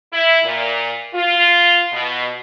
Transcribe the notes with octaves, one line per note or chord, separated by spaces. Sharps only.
E4
A#2
F4
B2